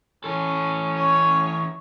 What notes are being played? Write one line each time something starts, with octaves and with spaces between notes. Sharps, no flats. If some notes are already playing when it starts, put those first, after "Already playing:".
E3 C#4 A4
C#5